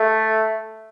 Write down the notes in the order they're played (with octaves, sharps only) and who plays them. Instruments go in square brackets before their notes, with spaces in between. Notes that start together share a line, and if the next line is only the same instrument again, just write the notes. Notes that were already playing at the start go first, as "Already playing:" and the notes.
Already playing: [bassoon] A3